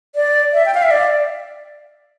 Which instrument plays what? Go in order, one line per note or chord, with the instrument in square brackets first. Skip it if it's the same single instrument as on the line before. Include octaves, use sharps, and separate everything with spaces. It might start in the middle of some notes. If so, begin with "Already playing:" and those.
[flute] D5
E5
G5
F5
E5
D5